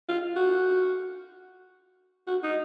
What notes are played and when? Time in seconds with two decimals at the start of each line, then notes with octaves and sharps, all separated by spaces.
0.09 F4
0.36 F#4
2.27 F#4
2.43 D#4